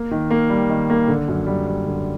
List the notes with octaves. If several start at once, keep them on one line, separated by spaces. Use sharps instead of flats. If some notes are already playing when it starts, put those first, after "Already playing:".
Already playing: A#3
D#3
A#3
G3
D#3
A#3
D3
F#2
G3
G3
D3